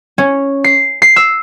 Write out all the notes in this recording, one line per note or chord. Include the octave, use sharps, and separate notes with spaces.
C#4
C7
C7
E6